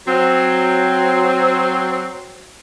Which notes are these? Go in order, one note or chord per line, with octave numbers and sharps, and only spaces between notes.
F#3 C4